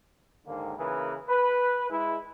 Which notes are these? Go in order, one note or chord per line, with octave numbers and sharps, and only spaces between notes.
D#2 G#2 D3 D#3 A#3
C#3 E3 A#3 G#4 A#4 B4
B4
G#3 E4